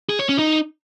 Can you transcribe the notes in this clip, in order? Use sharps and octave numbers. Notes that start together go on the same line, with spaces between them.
G#4
C#5
C#4
D#4